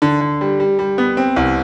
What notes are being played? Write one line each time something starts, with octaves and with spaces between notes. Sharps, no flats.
D3
D3
G3
G3
G3
B3
C4
C2